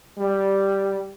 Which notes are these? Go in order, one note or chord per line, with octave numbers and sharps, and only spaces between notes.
G3